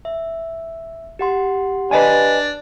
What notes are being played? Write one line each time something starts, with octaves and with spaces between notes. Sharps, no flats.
E5
G4 F#5 C6
D4 B4 D#5 G#5